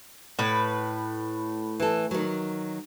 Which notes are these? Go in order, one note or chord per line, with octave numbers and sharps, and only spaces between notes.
A2 B4
E3 A4
D#3 F#3